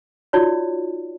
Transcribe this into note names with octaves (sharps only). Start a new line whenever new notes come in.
D#4 F4 F#4 C#5 D5